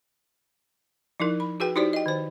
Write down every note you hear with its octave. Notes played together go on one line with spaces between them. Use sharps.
F3 D#4 E4 A#4
B5
F#4 G#4 B4 G5
D#4 E4 F#4 G4 C5 D5
D#5 G5
D#3 C5